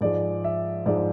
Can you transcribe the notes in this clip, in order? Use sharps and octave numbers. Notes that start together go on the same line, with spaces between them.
G#2 F3 G#3 D5
E5
G#2 F3 G#3 D5